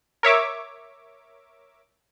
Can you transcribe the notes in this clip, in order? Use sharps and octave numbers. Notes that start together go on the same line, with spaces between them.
A#4 C#5 E5 D6